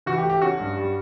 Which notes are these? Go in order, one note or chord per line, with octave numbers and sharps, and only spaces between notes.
E3 F#4
G4
A3
G4
C#4 F#4
G2
G3